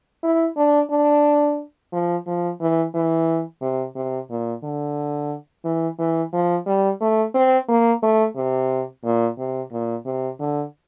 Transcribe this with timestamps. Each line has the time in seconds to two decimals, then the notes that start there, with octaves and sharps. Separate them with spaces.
0.23 E4
0.57 D4
0.91 D4
1.93 F3
2.27 F3
2.61 E3
2.94 E3
3.62 C3
3.96 C3
4.30 A#2
4.63 D3
5.65 E3
5.99 E3
6.33 F3
6.67 G3
7.01 A3
7.34 C4
7.69 A#3
8.03 A3
8.36 C3
9.04 A#2
9.38 C3
9.72 A#2
10.06 C3
10.40 D3